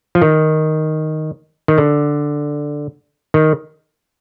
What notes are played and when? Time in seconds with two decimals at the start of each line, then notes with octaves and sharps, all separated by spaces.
0.15 F3
0.22 D#3
1.68 D#3
1.78 D3
3.34 D#3